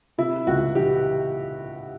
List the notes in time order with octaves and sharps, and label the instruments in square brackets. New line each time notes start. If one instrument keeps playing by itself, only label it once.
[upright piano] C3 E4
C#2 F#4
E3 G4